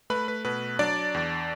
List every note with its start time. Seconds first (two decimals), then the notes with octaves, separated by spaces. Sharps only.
0.10 A3 B4 B5
0.28 B4
0.45 B2 B4
0.79 F#3 D4 D5
1.14 E2